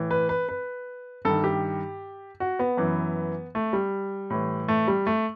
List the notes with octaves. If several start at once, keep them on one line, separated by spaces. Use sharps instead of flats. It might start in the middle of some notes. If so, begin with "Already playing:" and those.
Already playing: A2 E3
B4
B4
B4
G2 D#3 A4
G4
F#4
B3
F#2 E3
A3
G3
A2 E3
A3
G3
A3